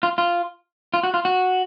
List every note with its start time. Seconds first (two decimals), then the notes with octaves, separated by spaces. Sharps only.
0.03 F4
0.18 F4
0.94 F4
1.04 F#4
1.14 F4
1.25 F#4